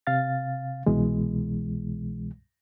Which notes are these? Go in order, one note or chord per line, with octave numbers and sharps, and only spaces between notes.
C3 F5 A6
C2 B2 E3 G#3